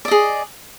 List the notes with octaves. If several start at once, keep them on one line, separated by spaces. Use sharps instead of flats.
G#4 D5 D#5